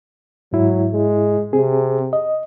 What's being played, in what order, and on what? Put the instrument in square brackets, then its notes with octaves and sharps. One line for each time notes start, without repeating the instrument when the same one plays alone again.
[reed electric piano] G#2 E4 [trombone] F#3
[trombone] G#3
[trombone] C3 [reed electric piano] C4 G#4
[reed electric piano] D#5